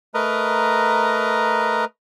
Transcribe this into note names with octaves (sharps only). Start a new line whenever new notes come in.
A3 A#4 B4 D#5 A#5